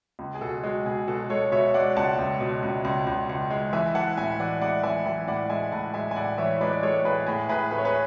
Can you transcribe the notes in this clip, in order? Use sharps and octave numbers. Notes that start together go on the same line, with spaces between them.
C#2
G#4
B2 F#4 A4
G#3 F#4
B2 G#4
B2 F#4 A4
G#3 A4 C#5
B2 C#5 E5
G#3 D5 F#5
C#2 F#5 A5
C#2
B2
C#2
C#2
C#2
C#2
G#3
E3 E5 G#5
E3 F#5 A5
A2 E5 G#5
E3 D5 F#5
G#3 D5 F#5
E3 E5 G#5
E3 E5 G#5
A2 D5 F#5
G#3 E5 G#5
A2 F#5 A5
G#3 E5 G#5
G#5
A2 D5 F#5
E3 C#5 E5
G#3 B4 D5
D5
G#3 A4 C#5
A2 G#4 B4
A2 G#4
A2 G#4 B4
A3 B4
C#5
G#4 B4